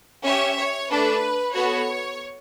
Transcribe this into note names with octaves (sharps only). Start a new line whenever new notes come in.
C#4 G4 C#5 E5
C#5
A3 D4 A4 B4
B3 F#4 A4 C#5